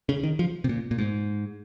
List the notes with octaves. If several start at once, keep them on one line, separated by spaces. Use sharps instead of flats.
C#3
D#3
F3
C3
A#2
A#2
G#2